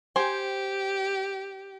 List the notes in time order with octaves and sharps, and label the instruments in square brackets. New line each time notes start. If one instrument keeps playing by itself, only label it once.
[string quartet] G4 [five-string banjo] C5 G5 G#5